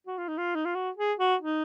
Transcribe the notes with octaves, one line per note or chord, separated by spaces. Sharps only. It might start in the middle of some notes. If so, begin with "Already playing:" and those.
F#4
F4
D#4
F4
D#4
F4
F#4
G#4
F#4
D#4